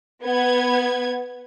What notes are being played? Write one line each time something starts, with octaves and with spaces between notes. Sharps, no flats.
B3 G#6